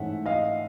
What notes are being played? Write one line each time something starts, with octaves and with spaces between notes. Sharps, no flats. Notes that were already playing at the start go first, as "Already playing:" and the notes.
Already playing: G#2 E3 A3 C#4 E5 F#5
D#5 F5